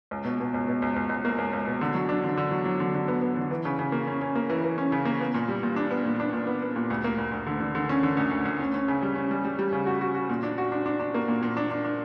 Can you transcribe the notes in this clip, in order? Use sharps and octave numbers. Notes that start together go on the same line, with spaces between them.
C#2
B2
B2
C#2
B2
C#2
C#2
C#2
A#3
C#2
C#2
B2
D3
F#3
D4
D3
D3
F#3
F#3
D3
D3
B3
B3
D3
E3
C#3
C#3
A#3
C#4
C#4
A#3
E3
E3
C#4
C#3
A#3
B3
A#2
G3
A#2
D4
B3
A#2
D4
A#2
B3
B3
A#2
D2
A#3
D2
D2
D3
D3
D3
C#4
D3
D2
D2
D2
C#4
C#4
C#3
G3
C#4
G3
G3
G3
C#3
F#4
F#4
F#4
A#2
D4
F#4
D4
D4
D4
A#3
A#2
A#2
D4
D4
D4